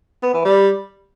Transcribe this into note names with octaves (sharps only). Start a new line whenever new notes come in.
B3
E3
G3